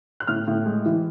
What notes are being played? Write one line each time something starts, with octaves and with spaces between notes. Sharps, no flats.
F#6
A2 F6
A2
G#3
E3